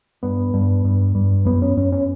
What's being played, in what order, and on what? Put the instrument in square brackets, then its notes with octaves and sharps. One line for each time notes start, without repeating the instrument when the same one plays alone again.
[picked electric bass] G2 B3
G2
G2
G2
F#2 B3
C#4
F#2 C#4
C#4